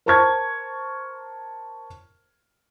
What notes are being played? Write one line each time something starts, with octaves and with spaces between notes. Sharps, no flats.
A#4 C5 A5 C#6 F6 G#6